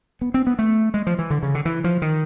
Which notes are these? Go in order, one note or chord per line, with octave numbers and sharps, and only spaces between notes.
B3
C4
B3
A3
G#3
F3
E3
D3
C#3
D3
E3
F3
D#3